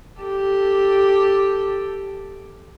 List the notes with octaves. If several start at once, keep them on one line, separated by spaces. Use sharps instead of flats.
G4 A4